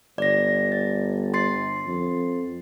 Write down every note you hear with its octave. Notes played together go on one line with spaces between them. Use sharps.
G1 D5 A#6
A6
C6 A6 C7
F2